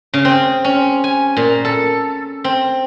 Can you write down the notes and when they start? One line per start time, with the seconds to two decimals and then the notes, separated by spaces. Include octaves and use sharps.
0.14 C#3
0.25 C4
0.64 C#4
1.04 G#5
1.37 A#2
1.65 A4
2.44 C4